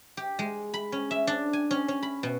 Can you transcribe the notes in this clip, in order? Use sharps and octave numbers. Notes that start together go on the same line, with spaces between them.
G4
G#3
B5
C#4
E5
D4
G#5
C#4
C#4
B5
B2